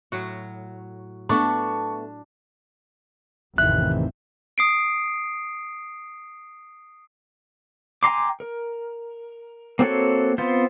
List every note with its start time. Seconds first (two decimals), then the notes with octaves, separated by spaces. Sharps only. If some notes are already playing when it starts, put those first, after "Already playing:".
0.12 A2 F#3 F#4
1.29 A3 B3 D4 C#6
3.58 A1 F2 C3 D#3 E3 C4 E5 F#6
4.58 D#6 C7 D7
8.03 G5 G#5 A#5 C6 D6
8.40 A#4
9.79 A#3 C4 F#4 A4 C#5
10.38 B3 C4 F4 C5